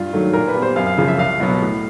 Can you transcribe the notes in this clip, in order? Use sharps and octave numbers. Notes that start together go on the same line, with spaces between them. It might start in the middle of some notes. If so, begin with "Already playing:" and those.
Already playing: G2 F4
D#3 F#3 A3
A#2 A#4
B4
G3 B3
C5
F#2 F5
F5
C#3 F3
E5
C2 F5
B2 F#3 B3
A2